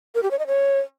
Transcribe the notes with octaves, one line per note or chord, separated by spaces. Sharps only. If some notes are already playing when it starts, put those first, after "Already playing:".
A#4
G4
C#5
D#5
C#5